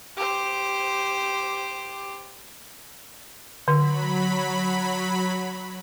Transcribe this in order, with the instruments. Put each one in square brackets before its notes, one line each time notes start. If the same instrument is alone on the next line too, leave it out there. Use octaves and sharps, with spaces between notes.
[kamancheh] G4 C5
[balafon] D3 [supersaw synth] F#3 B5